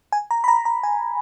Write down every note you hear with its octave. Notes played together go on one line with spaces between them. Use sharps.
G#5
A#5
B5
A#5
A#5
G#5